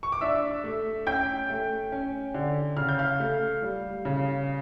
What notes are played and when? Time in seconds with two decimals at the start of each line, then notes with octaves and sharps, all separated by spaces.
0.03 C#6
0.12 D6
0.21 D4 E5 E6
0.64 A3
1.07 C#4 G5 G6
1.50 A3
1.92 C#4
2.34 D3
2.77 C#3 F6
2.89 G6
2.99 F5 F6
3.20 A3
3.62 G3
4.05 C#3